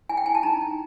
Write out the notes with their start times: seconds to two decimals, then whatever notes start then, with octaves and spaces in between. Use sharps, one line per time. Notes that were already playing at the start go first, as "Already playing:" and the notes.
0.09 E4 G#5
0.17 G5
0.26 E4 G#5
0.35 A5
0.43 D#4 A#5
0.61 D#4